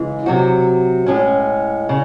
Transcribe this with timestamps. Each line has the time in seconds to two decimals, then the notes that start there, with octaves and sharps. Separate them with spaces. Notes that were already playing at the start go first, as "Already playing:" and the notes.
Already playing: C#3 E3 G#3
0.26 C3 F#3 C4 F#4
1.06 A2 G#3 C#4
1.89 C#3